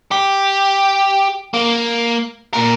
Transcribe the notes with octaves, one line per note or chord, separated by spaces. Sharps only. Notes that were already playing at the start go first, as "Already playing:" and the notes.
G4
A#3
A#2 A#4